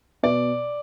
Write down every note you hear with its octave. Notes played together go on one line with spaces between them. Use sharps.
B2 D5